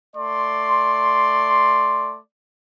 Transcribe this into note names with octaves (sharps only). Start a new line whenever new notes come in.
A3 D5 C6